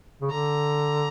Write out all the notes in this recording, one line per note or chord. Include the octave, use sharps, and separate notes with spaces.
C#3
D3 A#5